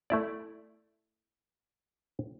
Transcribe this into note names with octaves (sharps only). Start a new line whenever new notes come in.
A3 E4 D5